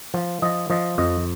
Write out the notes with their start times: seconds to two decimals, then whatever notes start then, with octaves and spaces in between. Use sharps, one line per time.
0.14 F3
0.42 F3 D#5
0.70 F3 D#5
0.98 F2 D#5